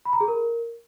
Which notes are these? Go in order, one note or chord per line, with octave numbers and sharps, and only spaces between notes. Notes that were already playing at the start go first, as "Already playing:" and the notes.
B5
A#5
G#4
A#4